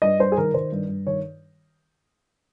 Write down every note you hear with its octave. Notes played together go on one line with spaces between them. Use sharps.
G2 D#5
G2 C5
G#4
D#3 A#4
D#3 C5
G2
G2
D#3 C#5